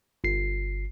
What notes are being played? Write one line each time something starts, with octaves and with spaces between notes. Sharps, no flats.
G1 C7